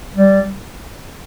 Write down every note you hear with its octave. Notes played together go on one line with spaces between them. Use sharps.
G3